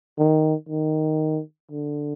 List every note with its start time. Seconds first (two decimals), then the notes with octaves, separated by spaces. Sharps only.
0.19 D#3
0.69 D#3
1.71 D3